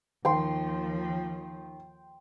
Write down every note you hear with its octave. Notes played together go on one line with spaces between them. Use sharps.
D#2 D#3 F3 G5 C6